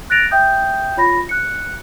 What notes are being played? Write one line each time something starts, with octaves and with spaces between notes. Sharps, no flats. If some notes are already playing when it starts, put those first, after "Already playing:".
F#6 A6 A#6 D7 F7
E5 G5 D#6 G6
F4 C#5 B5 A#6
F#6 C#7